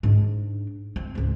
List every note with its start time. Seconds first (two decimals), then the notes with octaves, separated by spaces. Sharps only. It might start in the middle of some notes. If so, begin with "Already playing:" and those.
0.03 G#2 D4
0.96 C4
1.15 G#1 C#2